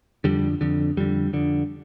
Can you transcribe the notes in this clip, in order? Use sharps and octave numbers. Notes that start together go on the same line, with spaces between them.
F2 D3 G3
F2 D3
F2 D3 G3
F2 D3